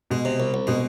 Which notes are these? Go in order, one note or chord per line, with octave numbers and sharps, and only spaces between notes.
B2 G#3
C3
C2
C2
B2 G#3